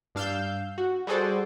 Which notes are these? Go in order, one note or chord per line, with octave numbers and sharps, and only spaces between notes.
G2 D4 F5 E6 G6
F#4
G3 F#4 G#4 A4 C5 D5